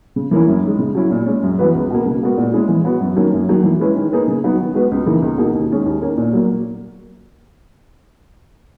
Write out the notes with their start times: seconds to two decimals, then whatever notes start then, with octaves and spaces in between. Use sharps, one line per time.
0.16 C#3
0.31 E3 A#3 C#4 E4
0.48 F#2
0.63 D#3 G#3
0.79 C#3
0.95 F#3 C#4 E4
1.11 A#2
1.26 G#3 C#4
1.43 F#2
1.59 E3 B3 F#4 B4
1.75 C#2
1.90 B2 A#3
2.06 C#3
2.22 G#3 B3 F#4 A#4
2.38 A#2
2.53 G#3 C#4 E4 G#4
2.69 E3
2.85 B3 F#4
3.01 F#2
3.17 D#3 F#3 A#3 C#4
3.33 F#2
3.48 D#3 F#3 A#3
3.64 E3
3.79 G#3 C#4 E4 B4
3.96 D#3
4.12 A#3 D#4 G#4 B4
4.28 C#3
4.44 F#3 B3 D#4 F#4
4.59 D#3
4.74 G#3 B3 F#4 B4
4.91 C#2
5.06 C#3 E3 A#3 D#4
5.22 C#2
5.38 B2 A#3 D#4 G#4
5.54 D#2
5.70 D#3 G#3 C#4 G#4
5.86 D#2
6.01 D#3 A#3 C#4
6.18 A#2
6.33 F#3 A#3